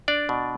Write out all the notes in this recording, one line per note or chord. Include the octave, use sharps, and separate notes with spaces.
D4 D5
B2